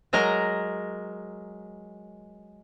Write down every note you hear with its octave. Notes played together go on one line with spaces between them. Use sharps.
F#3 G#3 A#4 A#5